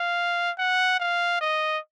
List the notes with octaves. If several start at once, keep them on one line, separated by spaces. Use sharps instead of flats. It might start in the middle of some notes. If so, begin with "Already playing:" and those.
Already playing: F5
F#5
F5
D#5